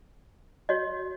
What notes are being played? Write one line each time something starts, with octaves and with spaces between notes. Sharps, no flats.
F#4 C#5 D#5